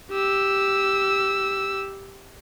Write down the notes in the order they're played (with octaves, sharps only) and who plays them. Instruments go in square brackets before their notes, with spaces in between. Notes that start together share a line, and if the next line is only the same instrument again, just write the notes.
[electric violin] G4 E6